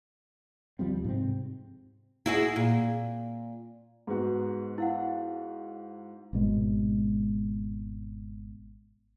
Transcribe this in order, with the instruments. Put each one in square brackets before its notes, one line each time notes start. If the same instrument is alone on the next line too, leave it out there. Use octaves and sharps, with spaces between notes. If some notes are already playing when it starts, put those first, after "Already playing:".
[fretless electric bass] D2 F3 G3 C4
G#2 C3 C4
[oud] E4 F#4 G#4
A#2
[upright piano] G#2 B3 F#4
[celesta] E4 F5 F#5
[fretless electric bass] G#1 B2 G#3